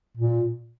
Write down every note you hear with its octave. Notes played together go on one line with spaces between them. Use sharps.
A#2